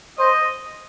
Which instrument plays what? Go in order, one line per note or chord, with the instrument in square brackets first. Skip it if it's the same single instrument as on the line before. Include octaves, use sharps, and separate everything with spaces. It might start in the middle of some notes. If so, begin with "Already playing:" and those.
[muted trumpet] C5 [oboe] D#5